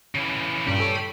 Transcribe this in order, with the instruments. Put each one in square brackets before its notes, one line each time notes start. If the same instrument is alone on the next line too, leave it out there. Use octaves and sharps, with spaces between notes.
[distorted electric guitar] C#3 E3
[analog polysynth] G2 A#2 C#3 [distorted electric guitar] G4 D5
[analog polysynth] A4 C#5
B5